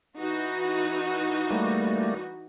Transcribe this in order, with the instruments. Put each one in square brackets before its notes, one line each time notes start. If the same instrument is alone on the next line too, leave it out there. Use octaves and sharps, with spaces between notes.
[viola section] E3 D#4 F#4
[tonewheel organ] G3 A3 A#3